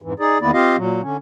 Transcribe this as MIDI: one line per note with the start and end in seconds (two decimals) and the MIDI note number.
0.02 0.13 41
0.02 0.13 44
0.02 0.13 52
0.20 0.38 63
0.20 0.38 68
0.20 0.38 74
0.42 0.51 40
0.42 0.51 51
0.42 0.51 58
0.42 0.51 59
0.42 0.51 64
0.42 0.51 74
0.53 0.76 60
0.53 0.76 65
0.53 0.76 67
0.53 0.76 75
0.53 0.76 77
0.77 1.02 46
0.77 1.02 54
1.02 1.17 50
1.02 1.17 61